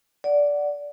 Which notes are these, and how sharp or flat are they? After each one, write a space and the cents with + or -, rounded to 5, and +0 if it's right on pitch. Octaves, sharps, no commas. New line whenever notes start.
D5 -10 F#5 +5